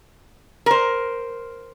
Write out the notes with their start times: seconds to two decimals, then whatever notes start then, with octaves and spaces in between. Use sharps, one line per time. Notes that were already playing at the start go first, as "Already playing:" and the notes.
0.66 A#4 C5